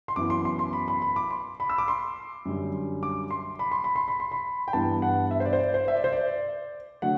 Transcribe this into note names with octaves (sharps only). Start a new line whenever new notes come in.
C6
F#2 E3 B3 D6
C6
C6
C6
B5
B5
B5
D6
C6
B5
E6
D6
C6
F#2 D3 G3
D6
C6
B5
C6
B5
C6
B5
C6
B5
G5
G2 E3 B3 A5
F#5
E5
C5
D5
C5
D5
C5
E5
D5
C5
D5
D3 F#3 A3 F#5